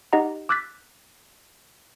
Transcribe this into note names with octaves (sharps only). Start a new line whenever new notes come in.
D#4 G4 D#5 F#5 A#5
D6 E6 F#6 G6 A6 B6